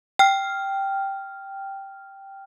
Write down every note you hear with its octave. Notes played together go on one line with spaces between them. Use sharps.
G5 F6